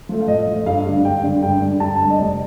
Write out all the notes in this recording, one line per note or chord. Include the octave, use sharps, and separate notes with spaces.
F3 A3
F5
A2 D#5
F3 A3
G2 F5
D3 G3 D4
G2 G5
D3 G3 D4
G2 G5
D3 G3 D4
G2 A5
D3 G3 D4
D#5
F1 D5